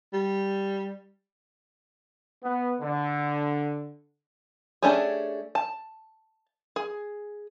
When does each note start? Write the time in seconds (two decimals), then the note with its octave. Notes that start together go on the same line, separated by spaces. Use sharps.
0.14 G3
2.43 B3
2.80 D3
4.82 A3 C#4 D4 G4 G#4
5.55 A5
6.76 G#4